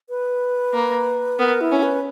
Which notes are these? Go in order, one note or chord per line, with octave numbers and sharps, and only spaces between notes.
B4
A#3
B3 A#4
E4
C#4
B4